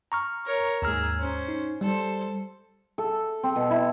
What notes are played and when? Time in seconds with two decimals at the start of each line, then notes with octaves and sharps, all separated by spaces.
0.12 A#5 C#6 F6
0.46 A#4 C#5
0.82 D#2 G#2 G#4 A#5 E6 F6
1.19 C#4 C5
1.48 D#4
1.81 G3 A4 C5
2.98 A4
3.43 C4
3.56 B2
3.71 E4